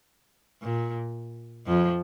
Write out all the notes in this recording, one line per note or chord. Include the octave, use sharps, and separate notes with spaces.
A#2
F2 F3